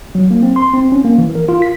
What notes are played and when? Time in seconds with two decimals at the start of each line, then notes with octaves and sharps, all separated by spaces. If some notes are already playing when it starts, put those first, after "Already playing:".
0.15 F#3
0.31 A#3
0.43 C4
0.56 C6
0.74 C4
0.92 C#4
1.05 A#3
1.18 E3
1.35 A#4
1.49 F4
1.62 B6